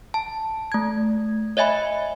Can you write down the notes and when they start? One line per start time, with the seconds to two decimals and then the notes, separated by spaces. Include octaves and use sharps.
0.14 A5
0.72 A3 G#6
1.57 C#5 D#5 E5 G#5 B5